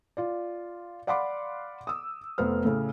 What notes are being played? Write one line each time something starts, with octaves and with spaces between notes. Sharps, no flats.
F4 D5
D5 F5 F#5 B5 C6 D6
D#6 E6
F1 B3 C5 F6
A2 C#3